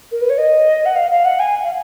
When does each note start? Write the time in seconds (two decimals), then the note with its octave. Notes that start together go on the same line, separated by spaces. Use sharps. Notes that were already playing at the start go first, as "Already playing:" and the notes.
0.12 A#4
0.21 B4
0.29 C#5
0.38 D#5
0.85 F#5
0.95 F5
1.11 F5
1.25 F#5
1.39 G#5
1.63 F5